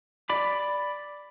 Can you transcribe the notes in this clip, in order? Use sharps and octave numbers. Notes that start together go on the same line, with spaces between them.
D5 B5 D6